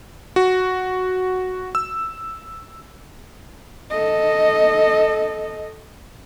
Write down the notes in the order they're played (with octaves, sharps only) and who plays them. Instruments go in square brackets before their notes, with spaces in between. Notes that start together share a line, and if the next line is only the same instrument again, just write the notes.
[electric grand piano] F#4
E6
[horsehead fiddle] A4 D#5